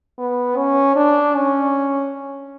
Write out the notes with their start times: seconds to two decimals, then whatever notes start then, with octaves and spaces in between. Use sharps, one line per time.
0.18 B3
0.57 C#4
0.95 D4
1.35 C#4